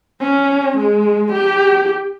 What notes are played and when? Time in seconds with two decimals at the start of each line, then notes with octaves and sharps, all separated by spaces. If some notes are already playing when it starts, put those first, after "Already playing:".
0.21 C#4
0.78 G#3
1.33 G4